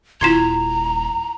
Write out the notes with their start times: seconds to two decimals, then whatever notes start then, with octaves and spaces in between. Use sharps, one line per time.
0.21 D#1 E4 F4 A#5 C6 G#6 E7